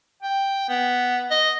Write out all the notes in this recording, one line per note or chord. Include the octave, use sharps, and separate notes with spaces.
G5
B3
D#5